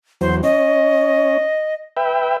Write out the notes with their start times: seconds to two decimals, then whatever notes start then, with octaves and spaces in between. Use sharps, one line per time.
0.21 E2 F#3 C5
0.43 C#4 D#5
1.97 B4 E5 G5